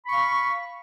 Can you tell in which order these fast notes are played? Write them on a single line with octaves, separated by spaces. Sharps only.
B5 C#6 F5